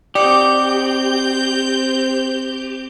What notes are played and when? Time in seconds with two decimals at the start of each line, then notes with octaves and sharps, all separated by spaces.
0.15 C4 D#4 G4 D5 F#5 D6 G6